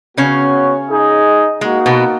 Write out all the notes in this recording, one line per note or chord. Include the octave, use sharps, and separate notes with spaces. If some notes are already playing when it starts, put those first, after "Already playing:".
C#3 B3 C#4 F#4 C#5
D#4 G#4 D#5
G#3 A#3 D#4 F#4
B2 B3